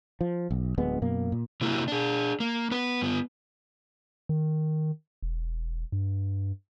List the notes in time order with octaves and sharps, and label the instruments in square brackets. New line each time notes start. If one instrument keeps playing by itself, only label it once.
[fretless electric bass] F3
B1
D1 D2 G#3 B3
F#2 B2 A#3
A#2
[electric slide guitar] C3 F#3 A#3 E4 F#4 G4
D4 G#4
A#3
B3 B4
G2 B3
[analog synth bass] D#3
E1
G2